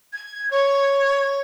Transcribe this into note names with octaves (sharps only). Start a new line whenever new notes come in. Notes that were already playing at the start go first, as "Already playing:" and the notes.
G#6
C#5